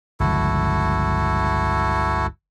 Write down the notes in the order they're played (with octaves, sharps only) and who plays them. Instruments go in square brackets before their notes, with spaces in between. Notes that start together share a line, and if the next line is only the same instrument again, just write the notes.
[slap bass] G1 C#2 F3 [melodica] E4 F#4 A4